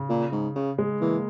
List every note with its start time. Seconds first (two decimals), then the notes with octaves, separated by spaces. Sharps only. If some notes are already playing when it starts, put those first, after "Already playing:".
Already playing: C#3
0.09 A#2
0.32 G#2
0.55 C#3
0.78 G#3
1.01 E3 A#3